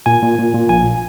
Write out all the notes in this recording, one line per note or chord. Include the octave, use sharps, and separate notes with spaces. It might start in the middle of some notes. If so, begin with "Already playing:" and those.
A#2 G#5
A#2
A#2
A#2
A#1 G#5